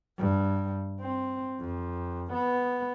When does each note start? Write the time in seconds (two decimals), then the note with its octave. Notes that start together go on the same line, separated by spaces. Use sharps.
0.19 G2
1.01 C4
1.60 F2
2.33 B3